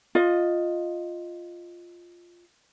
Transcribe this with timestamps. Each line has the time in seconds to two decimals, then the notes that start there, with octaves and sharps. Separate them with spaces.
0.15 F4 D#5